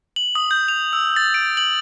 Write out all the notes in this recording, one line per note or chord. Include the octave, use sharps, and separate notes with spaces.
F#7
D#6
G6
F7
E6
A6
D7
F#7